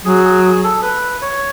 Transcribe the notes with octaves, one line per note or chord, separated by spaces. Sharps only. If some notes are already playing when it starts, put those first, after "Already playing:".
F#3 G#4
G#4
G#4
A4
B4
C#5